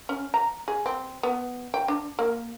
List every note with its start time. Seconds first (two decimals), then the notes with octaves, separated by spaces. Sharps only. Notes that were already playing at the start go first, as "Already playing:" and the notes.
0.09 C#4
0.34 A#5
0.68 G#4
0.86 C4
1.23 B3
1.74 G5
1.88 D4
2.19 A#3